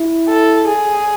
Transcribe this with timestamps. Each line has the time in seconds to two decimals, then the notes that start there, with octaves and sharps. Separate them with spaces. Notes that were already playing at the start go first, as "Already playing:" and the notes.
Already playing: E4
0.29 A4
0.67 G#4